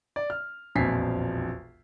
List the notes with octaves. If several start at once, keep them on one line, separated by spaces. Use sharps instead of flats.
D5
F6
E1 A#1 F2 G#5 B6 C7